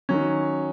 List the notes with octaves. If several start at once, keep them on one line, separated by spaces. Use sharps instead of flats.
D#3 F#3 C#4